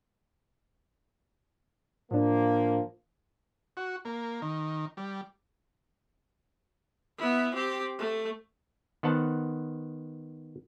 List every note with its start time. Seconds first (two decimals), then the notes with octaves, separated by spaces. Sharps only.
2.11 A2 F3 A#3 D4
3.77 F#4
4.05 A#3
4.42 D#3
4.97 G3
7.18 B3 E4
7.54 C4 G4
7.99 A3
9.03 D#3 B3 C5 F#5 A5